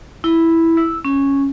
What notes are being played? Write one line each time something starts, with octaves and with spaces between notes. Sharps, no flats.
E4
E6
C#4